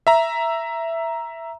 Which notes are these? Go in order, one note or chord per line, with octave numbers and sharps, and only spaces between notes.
E5 A#5